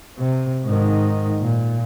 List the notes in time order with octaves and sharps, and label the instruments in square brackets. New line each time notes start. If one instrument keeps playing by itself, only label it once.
[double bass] C3
G#2 D#3
A#2